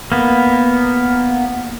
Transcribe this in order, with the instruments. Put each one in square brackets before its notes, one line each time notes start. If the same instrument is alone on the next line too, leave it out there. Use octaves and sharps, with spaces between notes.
[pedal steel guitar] A#3 B3